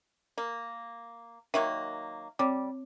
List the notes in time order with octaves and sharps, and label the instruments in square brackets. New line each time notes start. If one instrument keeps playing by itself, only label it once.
[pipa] A#3
[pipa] D#3 F#3 A#3 [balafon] E5
[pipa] G3 [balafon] C4 C#5 D6